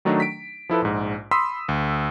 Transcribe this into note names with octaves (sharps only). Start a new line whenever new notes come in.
D#3 F#3 A3 D4 D#4
B6 D7
F3 E4 A4 B4
A#1 G#2
B5 C6 D#6 E6 B6
D2